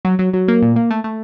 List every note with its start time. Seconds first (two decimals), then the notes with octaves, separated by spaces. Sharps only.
0.05 F#3
0.19 F#3
0.34 F#3
0.48 A#3
0.62 A#2
0.76 A#3
0.91 A3
1.04 A3